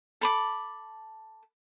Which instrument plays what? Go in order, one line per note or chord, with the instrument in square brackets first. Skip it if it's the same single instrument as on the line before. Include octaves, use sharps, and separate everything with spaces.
[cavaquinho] A4 B5 D6